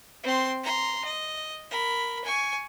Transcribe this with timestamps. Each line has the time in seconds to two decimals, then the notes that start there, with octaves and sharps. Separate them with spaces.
0.23 C4 C6
0.64 A#5 C6
1.04 D#5
1.71 A#4 B5
2.24 G#5 C#6